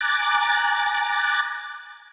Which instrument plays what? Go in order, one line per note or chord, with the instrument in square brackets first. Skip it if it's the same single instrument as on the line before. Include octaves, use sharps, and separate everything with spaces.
[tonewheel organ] G#5 A#5 D6 F#6 A6